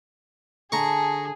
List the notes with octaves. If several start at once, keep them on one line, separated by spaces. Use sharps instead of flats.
D3 G#4 E5 A5 A#5 C#6